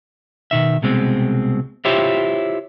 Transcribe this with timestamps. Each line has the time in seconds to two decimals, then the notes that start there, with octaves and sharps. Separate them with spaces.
0.51 B2 D#3 E5
0.82 C2 B2 G#3 C4
1.85 E4 F4 G4 C5 C#5 E5